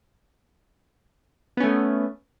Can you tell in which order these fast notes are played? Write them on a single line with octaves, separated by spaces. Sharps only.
B3 C#4 A3